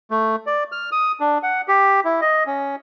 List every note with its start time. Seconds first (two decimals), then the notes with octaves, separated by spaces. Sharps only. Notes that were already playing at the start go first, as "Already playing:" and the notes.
0.11 A3
0.47 D5
0.72 F6
0.92 D#6
1.20 D4
1.43 F#5
1.68 G4
2.05 E4
2.21 D#5
2.47 C#4